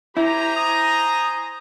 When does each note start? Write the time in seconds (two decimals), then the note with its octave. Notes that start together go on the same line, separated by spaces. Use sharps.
0.17 E4 G4 C5 G#5 A#5
0.56 D#6